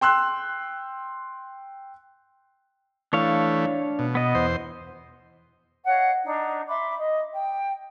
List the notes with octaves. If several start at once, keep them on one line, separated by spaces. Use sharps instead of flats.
G5 C6 E6 F#6
E3 A3 D4 C#5 F5
B2
B3 D#5
E2 C5
C#5 D#5 F5 F#5
D4 D#4
E5 B5 C6 D6
D#5
G5